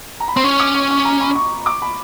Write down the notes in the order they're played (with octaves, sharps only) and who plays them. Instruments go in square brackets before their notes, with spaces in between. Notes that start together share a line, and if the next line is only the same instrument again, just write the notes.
[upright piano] A#5
B5
[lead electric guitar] C4 [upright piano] C6
[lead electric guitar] C#4 [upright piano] C#6
[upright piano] D6
C#6
C#6
A#5
B5
C#6
D6
B5